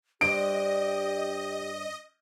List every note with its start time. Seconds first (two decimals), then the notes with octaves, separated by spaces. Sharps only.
0.21 G2 D4 G4 C5 D#5 D7